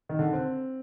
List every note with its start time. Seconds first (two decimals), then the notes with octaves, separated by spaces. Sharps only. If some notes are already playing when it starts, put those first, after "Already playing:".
0.09 D#3
0.19 D3
0.33 C4